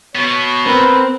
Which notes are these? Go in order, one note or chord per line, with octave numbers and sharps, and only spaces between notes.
B2 B3 C#5
C4 A#4 B4